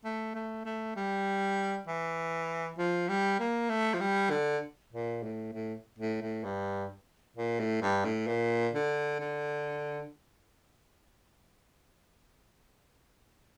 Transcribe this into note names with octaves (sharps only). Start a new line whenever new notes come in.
A3
A3
A3
G3
E3
F3
G3
A#3
A3
F3
G3
D3
A#2
A2
A2
A2
A2
G2
A#2
A2
G2
A2
A#2
D3
D3